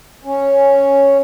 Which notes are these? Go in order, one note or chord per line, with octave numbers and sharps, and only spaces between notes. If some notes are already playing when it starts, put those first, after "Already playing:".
C#4